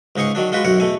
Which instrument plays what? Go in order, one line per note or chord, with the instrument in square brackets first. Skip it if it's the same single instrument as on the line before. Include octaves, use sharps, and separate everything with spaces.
[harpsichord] C#2 G#2 D#4 G#4 C#6
D#3 F#3 D4
G#3 F4 F#4 B4
B1 F#2 A#4 C#5 F#5
E2 B2 A3 G#5